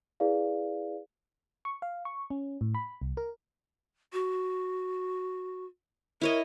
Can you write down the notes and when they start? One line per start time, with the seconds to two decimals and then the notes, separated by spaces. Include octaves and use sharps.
0.20 E4 G#4 B4 D5 F5
1.65 C#6
1.82 F5
2.05 C#6
2.30 C#4
2.61 A2
2.75 B5
3.01 C2
3.17 A#4
4.13 F#4
6.21 E4 A#4 C#5 D#5